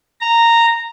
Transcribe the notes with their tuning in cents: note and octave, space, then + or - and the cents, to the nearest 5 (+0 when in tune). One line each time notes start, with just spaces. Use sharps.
A#5 -10